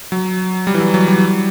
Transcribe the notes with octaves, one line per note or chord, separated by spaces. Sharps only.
F#3
G3
E3
F#3
F#3
G3